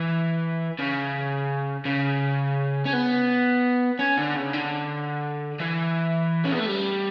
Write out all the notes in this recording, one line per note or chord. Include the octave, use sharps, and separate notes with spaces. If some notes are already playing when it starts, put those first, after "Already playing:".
Already playing: E3
C#3
C#3
C#4
B3
C#4
D3
C#3
D3
E3
C#4
B3
A3
G3